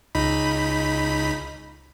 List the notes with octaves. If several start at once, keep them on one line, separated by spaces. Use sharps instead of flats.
C#2 D#4 B5